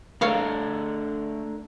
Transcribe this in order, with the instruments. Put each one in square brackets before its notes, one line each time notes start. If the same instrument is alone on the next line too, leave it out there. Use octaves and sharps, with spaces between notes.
[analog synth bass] A3 [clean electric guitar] D4 A4 A#4 [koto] C#5 F5 A#5